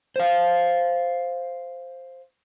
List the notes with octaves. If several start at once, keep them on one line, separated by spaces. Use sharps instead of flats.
C5 F5